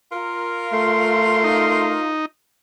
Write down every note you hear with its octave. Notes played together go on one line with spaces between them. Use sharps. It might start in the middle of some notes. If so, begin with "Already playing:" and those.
F4 A#4
A3 C6
D#4